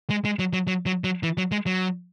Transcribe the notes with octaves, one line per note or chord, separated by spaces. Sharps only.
G#3
G#3
F#3
F#3
F#3
F#3
F#3
E3
F#3
G#3
F#3